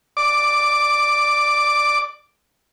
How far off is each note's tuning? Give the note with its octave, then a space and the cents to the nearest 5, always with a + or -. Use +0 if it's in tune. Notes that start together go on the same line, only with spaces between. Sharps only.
D5 +15 D6 +0